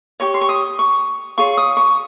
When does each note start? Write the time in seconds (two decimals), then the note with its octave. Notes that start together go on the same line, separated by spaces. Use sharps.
0.20 G4 C#5 C#6
0.34 C6
0.41 C#6
0.49 D#6
0.79 C#6
1.38 F4 G#4 C#5 C#6
1.57 D#6
1.77 C#6